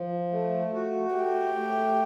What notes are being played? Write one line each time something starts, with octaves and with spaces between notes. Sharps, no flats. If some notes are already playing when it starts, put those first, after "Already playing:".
Already playing: F3
A3
F#4
A3 G4
A3